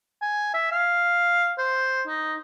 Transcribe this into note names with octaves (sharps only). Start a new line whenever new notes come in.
G#5
E5
F5
C5
D#4